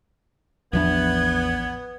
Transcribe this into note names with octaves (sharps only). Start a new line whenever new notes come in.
A1 E2 F3 B3 D4 G#6